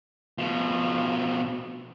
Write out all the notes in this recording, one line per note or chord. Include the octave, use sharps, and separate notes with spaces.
B2 F3